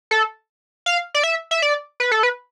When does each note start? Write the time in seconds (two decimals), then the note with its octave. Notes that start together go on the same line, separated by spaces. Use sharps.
0.11 A4
0.86 F5
1.14 D5
1.23 E5
1.51 E5
1.62 D5
2.00 B4
2.12 A4
2.23 B4